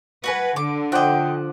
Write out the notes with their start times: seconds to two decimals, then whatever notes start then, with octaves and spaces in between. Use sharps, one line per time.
0.24 F#4 B4 F#5 G#5
0.56 D3 D6
0.92 F3 D#5 F#5 G5 D6